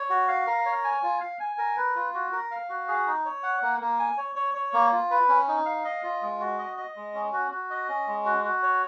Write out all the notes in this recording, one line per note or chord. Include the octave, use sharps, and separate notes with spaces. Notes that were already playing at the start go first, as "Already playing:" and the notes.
Already playing: C#5
F#4
F5
A#4
C#5
G#5
F4
F5
G#5
A#4
B4
F4
F#4
A#4
F5
F#4
G#4
D#4
C#5
F#5
A#3
A#3
G#5
C#5
C#5
C#5
A#3
F4
B4
C#4
D#4
F5
D#5
F4
G#3
F#4
D#5
D#5
G#3
C#4
F#4
F#4
D#5
C#4
G#3
F#4
F#4
C#5